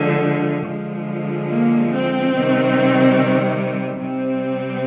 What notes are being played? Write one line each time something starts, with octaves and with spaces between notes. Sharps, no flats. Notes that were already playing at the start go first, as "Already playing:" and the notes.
Already playing: D3 F3 G#3
D3 F3 G#3
A#3
C4
C3 D#3 G3
C3 G3 C4